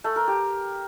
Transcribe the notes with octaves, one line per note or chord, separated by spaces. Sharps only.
A3
A#4
G4